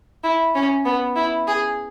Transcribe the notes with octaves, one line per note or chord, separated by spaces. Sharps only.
E4
C#4
B3
E4
G#4